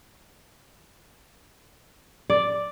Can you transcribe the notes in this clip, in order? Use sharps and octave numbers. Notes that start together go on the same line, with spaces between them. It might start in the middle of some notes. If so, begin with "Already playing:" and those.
D5